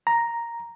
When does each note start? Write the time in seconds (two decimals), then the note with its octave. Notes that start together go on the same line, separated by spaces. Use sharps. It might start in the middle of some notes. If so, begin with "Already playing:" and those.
0.07 A#5